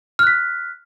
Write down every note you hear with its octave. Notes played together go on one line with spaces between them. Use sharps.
F6 F#6 B6